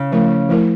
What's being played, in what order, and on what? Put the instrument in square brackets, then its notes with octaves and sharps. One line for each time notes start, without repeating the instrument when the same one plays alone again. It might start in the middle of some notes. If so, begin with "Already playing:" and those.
Already playing: [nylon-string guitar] C#3
[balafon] F3 A3 E4 A#4
F3 A3 E4 A#4